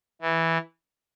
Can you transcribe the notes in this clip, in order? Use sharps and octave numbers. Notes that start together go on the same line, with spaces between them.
E3